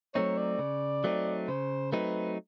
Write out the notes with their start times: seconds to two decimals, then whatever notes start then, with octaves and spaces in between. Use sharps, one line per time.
0.15 F#3 A3 C4 D#4 C#5
0.37 D5
0.59 C#3
1.04 F#3 A3 C4 D#4
1.48 C#3 C5
1.92 F#3 A3 C4 D#4 B4